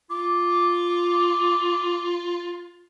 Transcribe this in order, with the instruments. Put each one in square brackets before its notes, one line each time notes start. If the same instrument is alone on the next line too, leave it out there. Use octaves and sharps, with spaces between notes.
[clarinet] F4 [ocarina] D6